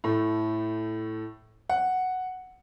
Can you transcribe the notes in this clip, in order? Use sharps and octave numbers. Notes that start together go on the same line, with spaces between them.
A2 A3
F#5